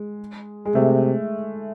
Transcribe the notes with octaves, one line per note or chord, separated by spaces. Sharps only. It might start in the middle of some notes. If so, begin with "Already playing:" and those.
Already playing: G#3
G#3
C3 A3